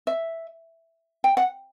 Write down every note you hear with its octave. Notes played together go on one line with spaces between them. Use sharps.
E5
G5
F#5